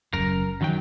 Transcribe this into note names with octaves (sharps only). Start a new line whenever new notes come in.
F#1 F#2 A#4
F#2 D#3 F#3 G5